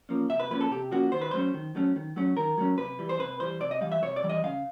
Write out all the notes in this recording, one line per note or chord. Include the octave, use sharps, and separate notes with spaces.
F3 A#3 C#4
C3 E5
B4
F3 A#3 C#4 B4
A4
C3 G4
F3 A#3 C#4 F#4
D#3 C5
B4
F#3 A3 C#4 C5
D#3
F#3 A3 C#4
D#3
F#3 A3 C#4
D#3 A#4
F#3 A3 C#4
C3 B4
E3 G3
C5
C3 B4
E3 G3 C5
C3 D5
D#5
E3 G3 F5
E5
C3 C#5
D5
E3 G3
D#5
C#3 F5